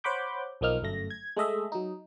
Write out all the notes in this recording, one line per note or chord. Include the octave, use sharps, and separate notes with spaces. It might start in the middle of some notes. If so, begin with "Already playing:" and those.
C5 C#5 F#5 B5 D6 G6
B1 F3 A#3 D#4 F6
G1 F#2 A3 A#6
G#6
G#3 A3 D#5 E5
F#3 D#4